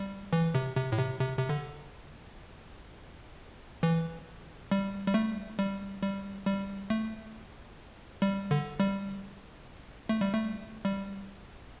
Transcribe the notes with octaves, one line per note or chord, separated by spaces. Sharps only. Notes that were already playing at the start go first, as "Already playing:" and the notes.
Already playing: G3
E3
C3
C3
A2
C3
C3
C3
D3
E3
G3
G3
A3
G3
G3
G3
A3
G3
D3
G3
A3
G3
A3
G3